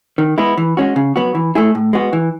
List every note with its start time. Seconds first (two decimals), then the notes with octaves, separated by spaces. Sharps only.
0.18 D#3
0.38 G#3 B3 E4
0.57 E3
0.77 G#3 C#4 F#4
0.96 C#3
1.16 F#3 B3 F#4
1.35 E3
1.55 A3 E4 G#4
1.75 A2
1.93 G#3 B3 F#4
2.13 E3